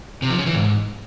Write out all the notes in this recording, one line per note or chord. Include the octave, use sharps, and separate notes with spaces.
C3
F3
C#3
E3
G#2